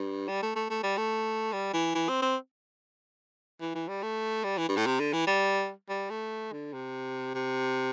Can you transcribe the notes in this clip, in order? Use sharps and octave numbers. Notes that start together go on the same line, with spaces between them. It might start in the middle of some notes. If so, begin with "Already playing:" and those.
Already playing: G2
G3
A3
A3
A3
G3
A3
G3
E3
E3
C4
C4
E3
E3
G3
A3
G3
E3
G2
A2
C3
D3
E3
G3
G3
A3
D3
C3
C3